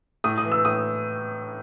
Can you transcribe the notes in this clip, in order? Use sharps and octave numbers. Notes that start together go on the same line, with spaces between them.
A2 D#6
D#6
E3
E6
A2 D#6